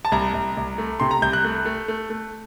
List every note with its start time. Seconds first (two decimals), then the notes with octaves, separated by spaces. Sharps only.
0.05 A5
0.12 C2 A#5
0.34 C2
0.57 C2
0.78 A3
1.00 C3 C6
1.11 A#5
1.22 C2 G6
1.33 F#6
1.44 A3
1.65 A3
1.88 A3
2.10 A3